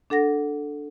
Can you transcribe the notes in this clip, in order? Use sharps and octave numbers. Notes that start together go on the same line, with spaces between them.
D4 A4 F#5 A#6